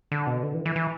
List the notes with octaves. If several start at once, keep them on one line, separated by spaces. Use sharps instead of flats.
D3
B2
D3
E3
E3
E3